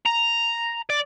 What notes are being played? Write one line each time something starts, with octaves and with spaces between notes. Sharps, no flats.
A#5
D5